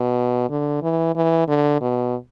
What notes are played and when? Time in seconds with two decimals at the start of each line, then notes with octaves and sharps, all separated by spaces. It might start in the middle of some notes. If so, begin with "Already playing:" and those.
Already playing: B2
0.50 D3
0.82 E3
1.15 E3
1.48 D3
1.81 B2